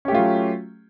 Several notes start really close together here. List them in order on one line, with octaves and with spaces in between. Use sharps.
C#4 G4 A3 F4 F#3